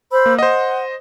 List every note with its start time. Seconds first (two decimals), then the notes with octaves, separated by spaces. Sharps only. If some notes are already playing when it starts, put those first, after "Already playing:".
0.12 C5 B5 E6
0.26 A#3
0.39 C5 D#5 F#5